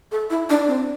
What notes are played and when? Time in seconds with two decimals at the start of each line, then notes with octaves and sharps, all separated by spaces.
0.12 A4
0.30 E4
0.50 D4
0.67 C4